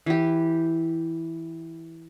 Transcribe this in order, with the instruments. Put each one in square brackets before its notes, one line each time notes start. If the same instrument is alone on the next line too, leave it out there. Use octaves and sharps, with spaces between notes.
[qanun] E3 G4